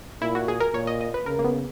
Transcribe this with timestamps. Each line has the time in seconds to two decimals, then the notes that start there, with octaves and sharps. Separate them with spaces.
0.22 A#2 E4
0.35 F#4
0.48 G#4
0.60 A#4
0.74 A#2 C#5
0.87 D#5
1.01 D#5
1.14 B4
1.26 C#3 A#4
1.39 A#3
1.44 B3